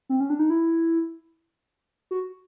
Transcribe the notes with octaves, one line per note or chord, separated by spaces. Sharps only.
C4
C#4
D4
D#4
E4
F#4